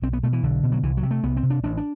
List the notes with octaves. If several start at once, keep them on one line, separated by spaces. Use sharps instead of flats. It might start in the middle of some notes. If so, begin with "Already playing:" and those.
B1 C4
B3
B2 A3
E3
B1 D3
B2
F#3
C2 E3
F#3
C3
A3
C2 B3
C4
C3
D4
A1 D4
D4